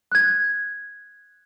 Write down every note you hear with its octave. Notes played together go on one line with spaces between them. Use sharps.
F#6 G#6